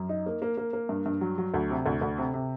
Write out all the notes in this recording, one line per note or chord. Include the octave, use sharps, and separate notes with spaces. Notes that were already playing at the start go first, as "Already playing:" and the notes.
Already playing: F#2
D#4
A#3
A#3
A#3
A#3
G2
G2
F#3
F#3
D2
C3
D2
D2
C3
C3